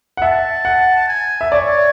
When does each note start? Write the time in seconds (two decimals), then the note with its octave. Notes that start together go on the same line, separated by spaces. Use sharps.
0.17 F#5
0.22 E5 A5
0.65 F#5
1.08 G#5
1.41 E5
1.52 C#5 D5